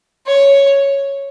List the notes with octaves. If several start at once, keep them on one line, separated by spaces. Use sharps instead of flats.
C#5